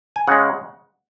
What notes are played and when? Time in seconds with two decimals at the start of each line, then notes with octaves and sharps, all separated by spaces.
0.16 G#5
0.27 C#3 G#3 F#5